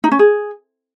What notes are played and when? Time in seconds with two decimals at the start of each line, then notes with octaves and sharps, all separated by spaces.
0.04 D#4
0.11 C#4
0.19 G#4